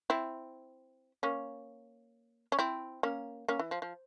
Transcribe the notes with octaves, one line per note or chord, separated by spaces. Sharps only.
C4 E4
A#3 C#4
C#4
C4 E4
A#3 C#4
A#3 C#4
E3
F3
F3